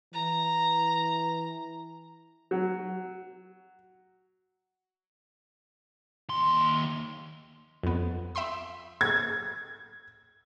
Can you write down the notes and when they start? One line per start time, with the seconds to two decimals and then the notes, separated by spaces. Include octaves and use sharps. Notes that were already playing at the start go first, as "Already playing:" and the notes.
0.14 E3 A#5
2.51 F#3
6.29 D#2 C6
7.83 F2 B3
8.35 E5 G5 B5 C6 D#6
9.01 G#6